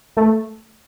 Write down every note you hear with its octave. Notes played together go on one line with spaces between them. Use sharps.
A3